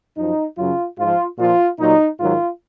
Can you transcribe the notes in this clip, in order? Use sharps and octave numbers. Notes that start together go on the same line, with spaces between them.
F#2 F3 D#4
F#2 C#3 F#3 F4
G#2 F3 F4
A#2 F3 F4
A#2 F#3 D#4
G#2 D#3 F#3 F4